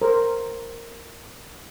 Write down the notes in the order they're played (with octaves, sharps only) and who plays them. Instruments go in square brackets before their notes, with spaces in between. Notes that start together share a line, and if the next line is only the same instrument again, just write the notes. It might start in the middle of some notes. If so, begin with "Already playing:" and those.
[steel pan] A#4 C5